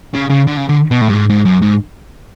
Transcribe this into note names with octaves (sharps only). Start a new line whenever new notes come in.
C#3
C#3
D3
C#3
D3
B2
A2
G2
G#2
G#2
F#2
G#2